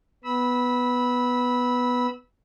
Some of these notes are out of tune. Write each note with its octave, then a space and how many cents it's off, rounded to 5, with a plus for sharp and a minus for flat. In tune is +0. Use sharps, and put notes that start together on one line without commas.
B3 +0 B5 -10 E6 -25